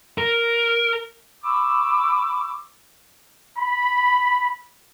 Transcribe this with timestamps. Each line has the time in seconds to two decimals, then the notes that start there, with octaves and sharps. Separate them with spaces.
0.18 A#4
1.42 B5 C#6 D6 E6
3.58 B5